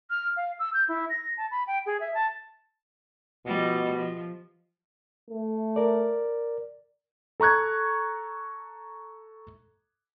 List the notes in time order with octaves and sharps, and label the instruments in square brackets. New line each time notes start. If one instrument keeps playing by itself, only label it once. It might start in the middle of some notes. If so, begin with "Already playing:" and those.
[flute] F6
F5
E6
G6
E4
A#6
A5
B5
G5
G#4
E5
A5
[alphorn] B2 [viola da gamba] F3 G3 D#5
[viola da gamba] F3
[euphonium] A3
[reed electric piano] A#4 D5
[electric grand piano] A4 A#5 C#6 F#6 G#6